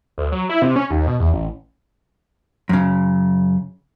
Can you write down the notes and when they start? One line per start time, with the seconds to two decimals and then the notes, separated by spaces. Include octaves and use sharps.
0.18 D2
0.32 F#3
0.49 E4
0.62 C3
0.76 C#4
0.91 D#2
1.07 B2
1.20 E2
1.33 A1
2.69 F#2 C#3